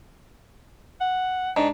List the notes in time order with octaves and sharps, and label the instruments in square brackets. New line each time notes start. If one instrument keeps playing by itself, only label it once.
[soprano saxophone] F#5
[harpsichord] G#2 [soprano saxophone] D4